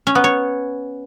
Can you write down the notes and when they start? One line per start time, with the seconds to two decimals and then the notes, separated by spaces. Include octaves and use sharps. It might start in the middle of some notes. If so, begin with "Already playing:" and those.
0.07 C#4
0.15 B3
0.24 C#5